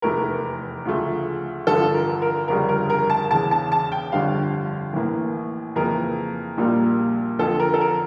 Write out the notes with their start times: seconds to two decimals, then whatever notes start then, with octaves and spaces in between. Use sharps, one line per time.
0.02 F1 E2 E3 A3 A#4
0.85 D2 C#3 F3 A3
1.67 A1 G2 D3 F3 A4
1.94 A#4
2.22 A#4
2.48 G1 F2 C#3 G3 A#4
2.69 A#4
2.90 A#4
3.10 A5
3.30 E1 E2 C#3 A5
3.51 A5
3.72 A5
3.92 G5
4.12 G1 F2 D3 G3 F5
4.93 A1 A2 E3 A#3
5.76 F2 C#3 E3 A#3 A#4
6.57 A#1 A#2 G3 A#3
7.39 F2 D3 F3 A4
7.60 A#4
7.74 A4
7.81 A#4